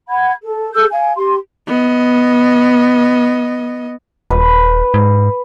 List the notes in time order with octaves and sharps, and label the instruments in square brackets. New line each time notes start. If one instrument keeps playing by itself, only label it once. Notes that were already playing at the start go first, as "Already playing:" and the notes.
[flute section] F#5 B5 G#6
A4
G#4 A4 E6 G6
F5 G#5
G4 C6
[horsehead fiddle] B3 D#5
[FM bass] D#1 [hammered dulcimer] B4
[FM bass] G#2